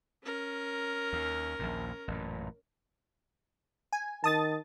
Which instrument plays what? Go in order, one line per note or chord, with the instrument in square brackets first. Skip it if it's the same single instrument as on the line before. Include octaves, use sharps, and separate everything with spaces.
[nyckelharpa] C#4 A#4
[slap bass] D#2
A#1 D#2 A#2
A1 F#2 A#2
[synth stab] G#5
[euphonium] D#3 [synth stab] A5 D#6 A6